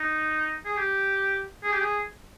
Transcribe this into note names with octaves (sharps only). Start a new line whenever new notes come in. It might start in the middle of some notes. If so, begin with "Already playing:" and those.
Already playing: D#4
G#4
G4
G#4
G4
G#4